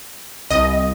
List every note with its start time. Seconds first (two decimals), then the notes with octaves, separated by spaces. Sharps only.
0.51 C2 D#5